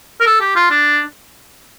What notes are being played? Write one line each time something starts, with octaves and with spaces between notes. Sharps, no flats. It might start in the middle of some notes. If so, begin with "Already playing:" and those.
A#4
A4
G4
F4
D4